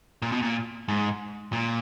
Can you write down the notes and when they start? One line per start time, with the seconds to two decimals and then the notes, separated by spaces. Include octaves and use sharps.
0.22 A#2
0.32 B2
0.42 A#2
0.88 G#2
1.53 A#2